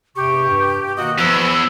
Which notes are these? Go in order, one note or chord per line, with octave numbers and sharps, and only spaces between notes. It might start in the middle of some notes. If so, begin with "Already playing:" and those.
E2 G2 C3 G4 C#6
G2
B2 D#3 A#3 F#4 D#5
E2 F3 B4 E6